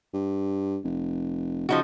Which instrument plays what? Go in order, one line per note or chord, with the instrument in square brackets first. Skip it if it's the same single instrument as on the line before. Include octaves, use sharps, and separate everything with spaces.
[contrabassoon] G2
F1
[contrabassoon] C#3 [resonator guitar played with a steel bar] F3 D#4 F#4